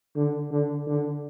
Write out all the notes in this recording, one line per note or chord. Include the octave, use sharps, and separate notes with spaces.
D3
D3
D3